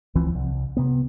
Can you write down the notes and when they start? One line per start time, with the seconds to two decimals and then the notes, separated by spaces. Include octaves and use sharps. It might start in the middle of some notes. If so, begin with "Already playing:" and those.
0.15 C#2 E3 F3 C4
0.34 C2
0.77 C3 B3